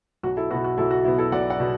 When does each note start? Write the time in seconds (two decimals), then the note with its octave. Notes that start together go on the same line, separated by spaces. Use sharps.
0.23 B1 F#4
0.37 E4 A4
0.50 B3 F#4
0.55 B2
0.64 F#4
0.78 B1 E4 A4
0.91 F#4
1.04 B2 B3 E4
1.18 E4 A4
1.32 B1 D5 F#5
1.50 D5 F#5
1.60 B2 B3